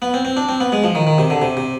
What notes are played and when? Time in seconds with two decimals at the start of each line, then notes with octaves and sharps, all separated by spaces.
0.02 B3
0.14 C4
0.25 C4
0.37 D4
0.49 C4
0.60 B3
0.72 G#3
0.84 F3
0.95 D#3
1.07 D#3
1.18 C3
1.30 D3
1.42 C3
1.57 C3